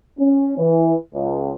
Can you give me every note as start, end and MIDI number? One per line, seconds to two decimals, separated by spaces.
0.19 0.56 61
0.58 0.94 52
1.14 1.52 37